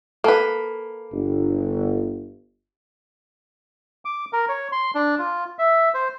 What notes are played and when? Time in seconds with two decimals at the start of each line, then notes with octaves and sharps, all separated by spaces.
0.24 A#3 A4 B4 A5
1.11 G1
4.05 D6
4.33 A#4
4.49 C#5
4.72 C6
4.95 D4
5.19 F4
5.59 E5
5.94 C5